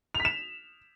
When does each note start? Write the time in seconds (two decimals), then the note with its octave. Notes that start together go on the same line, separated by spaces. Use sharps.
0.15 F7
0.20 B6
0.25 E7